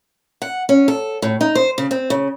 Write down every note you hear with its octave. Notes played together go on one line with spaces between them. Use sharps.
F#5
C#4
A4
A2
D#4
C5
C#3
C4
C#3